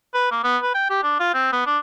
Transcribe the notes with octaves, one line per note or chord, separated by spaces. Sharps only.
B4
A#3
B3
B4
G5
G4
D4
F4
C4
B3
D4